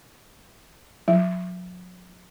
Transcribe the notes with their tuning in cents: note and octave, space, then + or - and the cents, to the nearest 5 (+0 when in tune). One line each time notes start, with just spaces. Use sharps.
F#3 -40